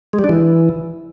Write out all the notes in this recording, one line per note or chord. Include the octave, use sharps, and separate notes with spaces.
G#3
G3
D4
E3